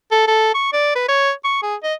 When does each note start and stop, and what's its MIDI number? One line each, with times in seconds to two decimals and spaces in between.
0.11 0.25 69
0.27 0.54 69
0.54 0.72 85
0.73 0.91 74
0.96 1.05 71
1.08 1.32 73
1.44 1.58 85
1.62 1.75 68
1.83 1.94 75